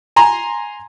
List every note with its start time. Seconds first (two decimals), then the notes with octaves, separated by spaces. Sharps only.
0.16 G#5 A#5 C6